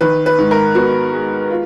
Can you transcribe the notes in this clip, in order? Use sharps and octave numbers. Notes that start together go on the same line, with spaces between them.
D#3 B4
B4
G#2
A#4
B3 F#4
G#3
F4